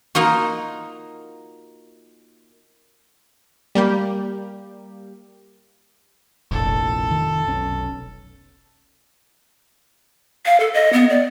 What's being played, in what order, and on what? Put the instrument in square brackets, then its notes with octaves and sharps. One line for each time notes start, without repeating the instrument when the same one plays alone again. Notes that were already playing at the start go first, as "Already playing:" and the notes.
[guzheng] A#3 D#4 F4 F#4
[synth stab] G3 A#3 G4
[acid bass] F1 [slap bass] A#1 A2 [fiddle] A4
[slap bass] D#3
B1 C#4
[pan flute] F5
A4
D#5
B3
D5